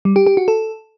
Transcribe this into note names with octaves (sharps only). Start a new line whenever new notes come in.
G3
G4
G4
F#4
A4